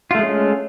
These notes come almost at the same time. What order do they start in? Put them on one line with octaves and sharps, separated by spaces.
F4 A3 G#3 C#4